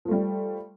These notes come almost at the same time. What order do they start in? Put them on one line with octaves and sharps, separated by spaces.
F3 A3 G3